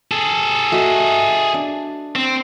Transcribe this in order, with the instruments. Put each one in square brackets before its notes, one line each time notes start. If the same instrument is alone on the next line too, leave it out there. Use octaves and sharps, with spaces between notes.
[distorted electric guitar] G#4 A4
[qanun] A3 F#4 D#5
D4
[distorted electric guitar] C4